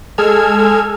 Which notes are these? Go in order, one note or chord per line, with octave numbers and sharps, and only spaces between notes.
G#3 G#4 A4 E6 F6 G#6